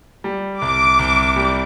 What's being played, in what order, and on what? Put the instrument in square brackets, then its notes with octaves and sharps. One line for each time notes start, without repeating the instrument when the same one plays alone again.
[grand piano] G3
[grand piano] C2 [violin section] D6
[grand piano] C2
G3